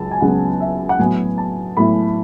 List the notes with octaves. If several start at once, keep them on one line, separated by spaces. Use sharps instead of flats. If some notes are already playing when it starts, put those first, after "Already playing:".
Already playing: C#2 C#3 F#3 A5
G#5
C#2 C#3 F#3 B3 F#5
E5
F#5
A2 F#3 B3 E4 G#5
A5
A2 F#3 B3 E4 B5